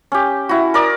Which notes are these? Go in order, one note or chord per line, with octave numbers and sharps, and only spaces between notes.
C#4 G4
E4 F#4
A#4 D5 D#6